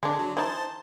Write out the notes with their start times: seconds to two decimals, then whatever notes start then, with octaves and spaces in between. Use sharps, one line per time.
0.03 D3 G#3 D4
0.19 F#3
0.37 E3 D#4 C5 A5